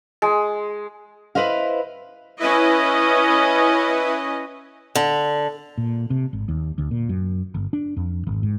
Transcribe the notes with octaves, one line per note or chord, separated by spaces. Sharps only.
G#3
E4 B4 C5 D#5 F5
C#4 E4 B4 D#5
D3
A#2
C3
G#1
D#2
D2
A#2
F#2
G1
D4
F2
G#1
G#2